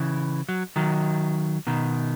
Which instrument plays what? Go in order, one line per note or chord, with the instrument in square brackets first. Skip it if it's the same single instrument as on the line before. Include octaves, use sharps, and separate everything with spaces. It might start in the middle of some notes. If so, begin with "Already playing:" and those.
Already playing: [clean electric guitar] C#3 E3
F#3
D#3 F#3
B2 D#3